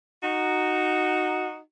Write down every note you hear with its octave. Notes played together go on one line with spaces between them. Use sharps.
D#4 F#4